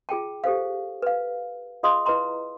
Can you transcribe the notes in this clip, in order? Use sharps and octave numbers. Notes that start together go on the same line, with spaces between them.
F4 G#4 G5 A5
G4 A4 C5 F5
B4 F5
F4 G#4 D#5 F5 C6 D#6
E4 B4 D#5 A#5 C6